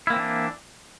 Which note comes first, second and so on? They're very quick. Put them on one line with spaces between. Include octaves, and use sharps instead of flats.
E4 A#3 C4 E3 D4